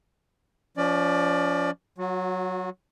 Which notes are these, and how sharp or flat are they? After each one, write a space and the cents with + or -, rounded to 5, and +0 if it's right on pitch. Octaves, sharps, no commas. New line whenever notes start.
F3 +0 C#4 +35 D5 +20
F#3 +0 F#4 -35